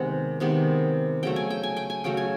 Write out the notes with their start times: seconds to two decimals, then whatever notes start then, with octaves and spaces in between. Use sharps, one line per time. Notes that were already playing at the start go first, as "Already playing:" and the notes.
Already playing: C3 D#3 G#3 B3 F#5
0.40 C3 D#3 G#3 B3
1.23 C#3 F#3 A3 G5
1.36 G#5
1.50 G5
1.63 G#5
1.77 G5
1.90 G#5
2.04 C#3 F#3 A3 G5
2.17 G#5